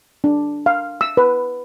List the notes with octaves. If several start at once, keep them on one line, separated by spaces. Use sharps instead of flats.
D4
F5
E6
B4